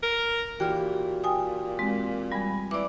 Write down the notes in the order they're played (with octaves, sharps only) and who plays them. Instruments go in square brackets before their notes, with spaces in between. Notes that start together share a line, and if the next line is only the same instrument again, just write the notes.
[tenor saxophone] A#4
[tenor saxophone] A#2 [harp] E3 F#4 G4 [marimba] G5 F6
[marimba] G5 G#5 D#6
G#3 C4
[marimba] G3 [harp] G#5 B5
[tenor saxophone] E3 [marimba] D5 D6